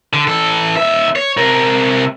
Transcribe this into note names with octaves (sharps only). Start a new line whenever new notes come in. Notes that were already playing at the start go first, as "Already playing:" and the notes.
D3
E3 A4
D#2 E5
C#5
C3 A#4